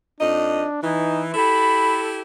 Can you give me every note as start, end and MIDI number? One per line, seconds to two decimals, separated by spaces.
0.20 0.64 41
0.20 0.82 62
0.20 0.64 63
0.20 0.64 75
0.83 1.34 52
0.83 1.25 63
1.34 2.21 64
1.34 2.21 67
1.34 2.21 69
1.34 2.00 83